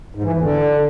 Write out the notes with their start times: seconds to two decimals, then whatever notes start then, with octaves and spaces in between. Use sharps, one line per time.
0.15 G#2
0.23 E3
0.32 E2
0.41 D3